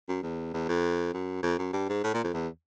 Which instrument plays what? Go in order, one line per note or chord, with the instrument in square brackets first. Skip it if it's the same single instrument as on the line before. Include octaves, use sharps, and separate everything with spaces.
[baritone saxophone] F#2
E2
E2
F2
F#2
F2
F#2
G2
G#2
A2
A#2
F2
E2